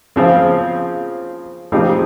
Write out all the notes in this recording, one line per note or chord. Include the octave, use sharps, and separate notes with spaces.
C#3 F3 C4 F4
C#3 F3 C4 D#4 G4